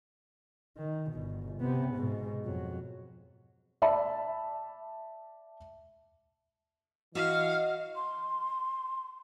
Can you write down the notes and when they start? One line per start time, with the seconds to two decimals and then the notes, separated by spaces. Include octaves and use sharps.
0.77 D#3
1.11 G1 B2
1.59 C3 B3
1.95 G#2 B2
2.45 F2 F#3
3.82 D5 E5 A5 B5
7.15 E3 F#4 D#5 F5
7.96 C6